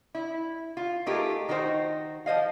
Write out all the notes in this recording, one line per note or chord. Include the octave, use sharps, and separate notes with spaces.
E4
F4
A3 D#4 F4 G4 G#4 A#4
D#3 D#4 F#4 A4 C5
F3 C5 D#5 F5